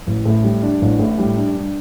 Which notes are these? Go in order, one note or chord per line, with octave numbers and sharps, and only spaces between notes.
A1
A2
G3
D4
A1
A2
G3
D4
G2